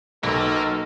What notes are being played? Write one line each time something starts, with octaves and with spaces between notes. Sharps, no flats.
B1 A#3 A4 A#4